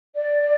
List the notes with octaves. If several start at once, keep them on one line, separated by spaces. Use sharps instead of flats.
D5